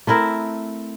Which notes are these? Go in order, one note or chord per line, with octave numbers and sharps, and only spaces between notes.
A3 C4 E4 A#4